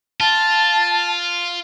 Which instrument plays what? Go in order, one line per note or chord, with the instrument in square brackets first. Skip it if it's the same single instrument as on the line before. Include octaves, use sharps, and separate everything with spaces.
[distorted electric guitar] F4 [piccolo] A5